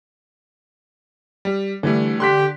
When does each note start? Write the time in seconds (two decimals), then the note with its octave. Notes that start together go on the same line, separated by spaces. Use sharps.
1.45 G3
1.83 D3 E3 G3 A3
2.20 D3 G4 C6 F#6 B6